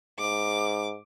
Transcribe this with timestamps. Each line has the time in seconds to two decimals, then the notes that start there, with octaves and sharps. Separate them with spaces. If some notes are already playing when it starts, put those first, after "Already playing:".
0.19 G#2 D6